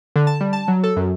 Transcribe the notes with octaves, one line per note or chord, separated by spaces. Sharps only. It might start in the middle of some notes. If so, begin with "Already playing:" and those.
D3
A5
G3
A5
F#3
A4
F#2